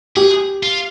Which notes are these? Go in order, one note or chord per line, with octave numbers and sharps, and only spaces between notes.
G4 G#4
F4